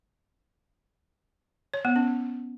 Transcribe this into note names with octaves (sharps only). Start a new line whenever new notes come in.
C#5
B3
C#4